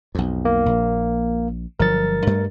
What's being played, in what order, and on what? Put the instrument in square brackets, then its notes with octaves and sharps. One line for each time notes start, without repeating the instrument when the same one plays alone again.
[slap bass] B1 F2
[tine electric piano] A#3
[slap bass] A#1
[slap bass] G1 F3 F#3 [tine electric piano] A#4 A6
[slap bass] G2 G3 A3